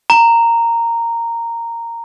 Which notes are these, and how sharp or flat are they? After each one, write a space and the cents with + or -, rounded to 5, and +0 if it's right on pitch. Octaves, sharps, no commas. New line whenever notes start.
A#5 -10